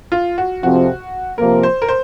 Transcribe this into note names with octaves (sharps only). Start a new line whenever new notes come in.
F4
F#4
F2 C3 F3 C4 F#4
C3 F3 A#3 A#4
C5
A#4
C5